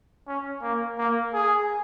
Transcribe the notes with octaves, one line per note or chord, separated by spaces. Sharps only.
C#4
A#3
A#3
G#4